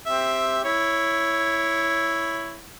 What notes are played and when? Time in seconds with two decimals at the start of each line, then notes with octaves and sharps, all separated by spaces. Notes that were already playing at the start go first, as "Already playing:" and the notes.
0.06 C4 G4 E5
0.64 E4 C#5